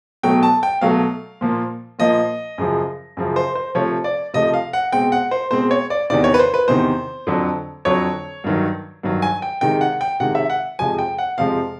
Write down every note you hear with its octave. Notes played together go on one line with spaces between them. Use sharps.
B2 F#3 A3 G5
A5
G5
B2 F#3 A3 F5
A#2 F3 A#3
A#2 F3 A#3 D#5
F#2 C#3 F3
F#2 C#3 F3
C5
C5
C3 F3 A3 C#5
D5
C3 F3 A3 D#5
F5
F#5
B2 G#3 C4 G5
F#5
C5
B2 G#3 C4 C5
C#5
D5
E2 C3 D#3 D5
C#5
B4
C5
B4
E2 C3 D#3 C5
F2 D3 F#3
F2 D3 F#3 C#5
G2 D#3 F#3
G2 D#3 F#3
G#5
G5
C3 D#3 G#3 G5
F#5
G5
C3 D#3 G#3 F#5
E5
F#5
F2 C3 F3 G#3 G#5
G5
F#5
F2 C3 F3 G#3 F5